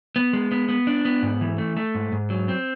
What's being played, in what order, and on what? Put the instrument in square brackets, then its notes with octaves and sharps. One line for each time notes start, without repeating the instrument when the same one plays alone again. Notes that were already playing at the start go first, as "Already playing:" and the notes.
[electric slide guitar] B3
G#3
B3
B3
D4
B3
G#2
E3
A3
A3
G#2
G#2
F#3
C4